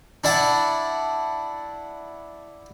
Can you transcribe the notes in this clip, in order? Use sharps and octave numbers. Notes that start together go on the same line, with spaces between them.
D4 E4 F#5 A5